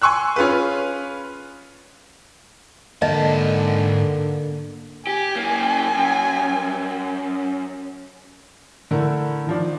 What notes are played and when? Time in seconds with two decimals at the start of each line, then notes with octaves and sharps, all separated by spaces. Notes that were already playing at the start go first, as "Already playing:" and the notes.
0.02 G#5 C6 C#6 E6 F#6
0.36 C#4 F4 G#4 B4
3.02 G#2 D3 A#3 D#5 E5 A5
5.07 G4 G#5
5.36 F#2 A#3
5.95 F#2
8.91 D3 A3 E4 A#4
9.47 D#3 F3 D4